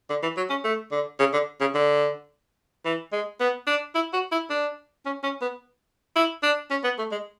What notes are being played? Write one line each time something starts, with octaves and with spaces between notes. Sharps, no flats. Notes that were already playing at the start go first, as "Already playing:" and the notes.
D3
E3
F#3
C#4
A3
D3
C#3
D3
C#3
D3
E3
G#3
B3
D4
E4
F#4
E4
D4
C#4
C#4
B3
E4
D4
C#4
B3
A3
G#3